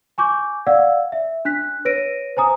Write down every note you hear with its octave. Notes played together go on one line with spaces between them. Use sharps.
G#5 C#6 D6 G6
D5 F5 F#5 E6
E5
D4 F#6 B6
B4 C#5 A#6 D7 D#7
C5 G#5 A#5 D#6